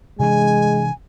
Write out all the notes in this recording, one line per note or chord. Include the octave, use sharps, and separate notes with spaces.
C3 E3 G#3 D4 G#5